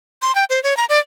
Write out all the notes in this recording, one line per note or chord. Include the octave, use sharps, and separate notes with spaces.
C6
G5
C5
C#5
A#5
D5